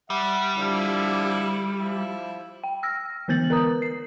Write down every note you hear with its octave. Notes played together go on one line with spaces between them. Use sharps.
G3 E5 F#5
D3 F3 E4
F3 E4
G5
E6 F6 A#6
D3 E3 B3 G6 A6 F#7
A#4 B4 A#5 D#6
C7